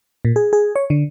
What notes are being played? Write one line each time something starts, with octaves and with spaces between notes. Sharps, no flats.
A#2
G#4
G#4
C#5
D3